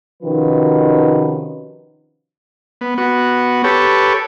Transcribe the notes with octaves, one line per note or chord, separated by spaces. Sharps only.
C3 D#3 F3 C#4 F#4 B4
B3
B3 F#4
G4 A4 B4 C#5